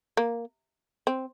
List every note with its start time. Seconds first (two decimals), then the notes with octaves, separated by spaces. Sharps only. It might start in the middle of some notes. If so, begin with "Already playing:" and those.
0.17 A#3
1.07 C4